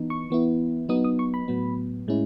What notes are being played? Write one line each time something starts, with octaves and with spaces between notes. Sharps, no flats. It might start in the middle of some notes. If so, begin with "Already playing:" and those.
Already playing: E3 B3 D#4
C#6
E3 B3 E4
F#3 B3 D#4 D#6
D#6
C#6
B5
A2 F#3 B3
A2 G#3 C#4 E4